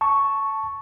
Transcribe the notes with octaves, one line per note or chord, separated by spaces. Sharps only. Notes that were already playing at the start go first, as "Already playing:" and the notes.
A5 C#6